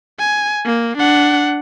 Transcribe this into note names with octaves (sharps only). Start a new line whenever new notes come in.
G#5
A#3
D4 F#5